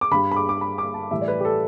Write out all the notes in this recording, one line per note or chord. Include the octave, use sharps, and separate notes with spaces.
D6
G2 G3 B5
B5
D6
D6
B5
D6
A5
A2 E3 G3 E5
D5
B4
G4
A4